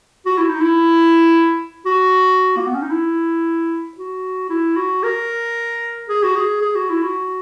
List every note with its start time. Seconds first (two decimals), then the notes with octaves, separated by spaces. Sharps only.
0.26 F#4
0.38 E4
0.50 D#4
0.61 E4
1.86 F#4
2.57 A#3
2.66 B3
2.75 C#4
2.82 D#4
2.91 E4
3.97 F#4
4.50 E4
4.76 F#4
5.03 A#4
6.09 G#4
6.23 F#4
6.36 G#4
6.62 G#4
6.75 F#4
6.90 E4
7.03 F#4